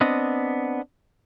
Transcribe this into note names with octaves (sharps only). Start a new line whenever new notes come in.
B3 C4 D4 D#5